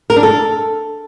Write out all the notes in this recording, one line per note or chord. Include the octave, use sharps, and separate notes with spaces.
A#4
D4
A4